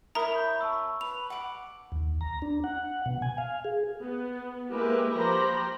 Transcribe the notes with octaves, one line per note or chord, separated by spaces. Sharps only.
E4 A#4 C#5 A#5 D#6
B5 G6
A5 C#6 E6
B4 F7
F#5 D6
D#2
A#5
D4
F#5
B2
G#5
F5
G#4
B3
G#3 A#3 E4 G4 A#4 B4
F3 G4 C5 A#5 B5